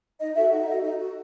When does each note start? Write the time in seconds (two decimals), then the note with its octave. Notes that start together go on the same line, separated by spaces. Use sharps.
0.20 D#4 D#5
0.36 F#4 A4 E5
0.52 D#4 F#5
0.62 E5
0.67 A4 D#5
0.72 F#4
0.83 D#4 D#5
0.99 F#4 A4